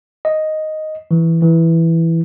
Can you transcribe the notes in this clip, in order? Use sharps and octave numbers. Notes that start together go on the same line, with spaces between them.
D#5
E3
E3